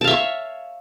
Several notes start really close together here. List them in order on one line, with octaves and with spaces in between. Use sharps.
A5 F5 E5 C#5